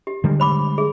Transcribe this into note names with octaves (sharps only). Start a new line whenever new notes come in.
G4
D3 G3 G#3
C5 B5 D6
G#4